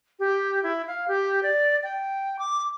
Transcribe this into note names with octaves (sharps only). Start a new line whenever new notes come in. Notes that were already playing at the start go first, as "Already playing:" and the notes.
G4
E4
F5
G4
D5
G5
D6